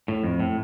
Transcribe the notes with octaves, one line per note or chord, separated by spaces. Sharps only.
A2
F2
A2